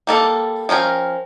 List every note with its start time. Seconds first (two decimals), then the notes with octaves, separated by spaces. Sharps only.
0.07 G3 A#3 A4
0.69 F3 C#4 A#4 G5